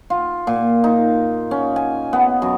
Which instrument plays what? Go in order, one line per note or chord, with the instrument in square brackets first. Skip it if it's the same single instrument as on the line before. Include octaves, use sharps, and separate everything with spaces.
[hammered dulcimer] F4
A#2
D#4
C#4
G#5
B3
F#2